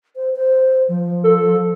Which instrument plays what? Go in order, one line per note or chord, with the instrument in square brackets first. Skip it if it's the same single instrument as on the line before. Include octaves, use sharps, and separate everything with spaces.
[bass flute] C5
C5
F3
[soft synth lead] A4